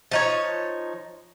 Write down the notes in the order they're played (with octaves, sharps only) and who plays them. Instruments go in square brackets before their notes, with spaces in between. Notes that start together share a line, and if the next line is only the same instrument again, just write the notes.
[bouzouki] F3 D#4 C#5